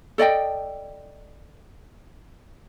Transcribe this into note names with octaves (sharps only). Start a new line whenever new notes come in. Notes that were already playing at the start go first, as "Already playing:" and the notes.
A4 D5 D#5 G5